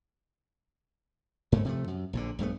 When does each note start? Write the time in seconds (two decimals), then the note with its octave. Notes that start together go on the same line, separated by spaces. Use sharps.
1.52 G#2 G#3 A3
1.65 C3 F3 A3
1.88 F#2
2.13 A#1 A#2 D3
2.39 A#1 G2 A3 B3